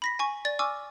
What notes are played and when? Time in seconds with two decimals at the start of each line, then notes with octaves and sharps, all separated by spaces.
0.02 B5 A#6 B6
0.19 G#5 C#6
0.45 D5 A6
0.59 G#5 C#6 D6 E6 F6